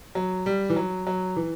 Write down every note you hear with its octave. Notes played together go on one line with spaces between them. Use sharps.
F#3
G3
E3
F#3
F#3
E3